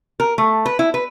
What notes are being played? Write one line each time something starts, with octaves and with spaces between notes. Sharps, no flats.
A#4
A3
B4
E4
B4